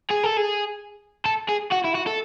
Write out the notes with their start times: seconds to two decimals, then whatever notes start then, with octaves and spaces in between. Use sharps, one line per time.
0.10 G#4
0.24 A4
0.37 G#4
1.25 A4
1.49 G#4
1.72 F#4
1.84 E4
1.95 F#4
2.06 A4